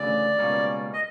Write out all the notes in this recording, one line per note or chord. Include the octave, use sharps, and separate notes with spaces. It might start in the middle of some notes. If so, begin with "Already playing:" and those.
Already playing: D2 C#3 E3 D5
C#2 B2 G3 A#3 C#4
D#5